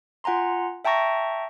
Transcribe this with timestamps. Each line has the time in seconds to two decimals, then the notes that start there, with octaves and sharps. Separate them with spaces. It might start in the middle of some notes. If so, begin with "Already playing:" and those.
0.24 F4 F#5 G#5 A#5 C6
0.85 E5 G5 A5 A#5 C#6 A#6